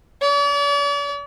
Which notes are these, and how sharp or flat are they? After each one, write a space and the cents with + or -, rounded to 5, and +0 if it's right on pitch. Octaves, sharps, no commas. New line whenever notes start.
D5 -45